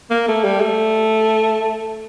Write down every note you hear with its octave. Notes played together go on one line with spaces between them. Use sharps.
A#3
A3
G3
A3